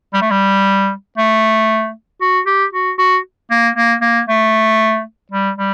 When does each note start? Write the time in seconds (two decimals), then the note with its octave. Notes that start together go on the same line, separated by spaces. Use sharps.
0.14 G3
0.22 A3
0.30 G3
1.17 A3
2.21 F#4
2.46 G4
2.73 F#4
2.98 F#4
3.51 A#3
3.76 A#3
4.02 A#3
4.29 A3
5.32 G3
5.58 G3